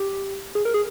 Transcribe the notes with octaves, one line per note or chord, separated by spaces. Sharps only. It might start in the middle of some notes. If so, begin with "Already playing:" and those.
Already playing: G4
G#4
A#4
G#4